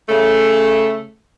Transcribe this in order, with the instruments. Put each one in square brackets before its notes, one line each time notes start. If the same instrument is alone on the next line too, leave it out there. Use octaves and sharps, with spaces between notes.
[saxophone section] C#3 A3